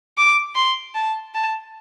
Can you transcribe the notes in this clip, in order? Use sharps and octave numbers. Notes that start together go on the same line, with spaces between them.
D6
C6
A5
A5